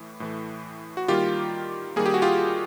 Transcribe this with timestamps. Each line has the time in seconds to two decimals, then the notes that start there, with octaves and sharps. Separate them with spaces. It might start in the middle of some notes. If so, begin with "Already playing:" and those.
Already playing: A2 E3 A3
0.20 A2 E3 A3
0.97 F#4
1.08 D#3 G3 A#3 F4 G4
1.96 D#3 G3 A#3 G#4
2.06 G4
2.14 F#4
2.22 F4 G4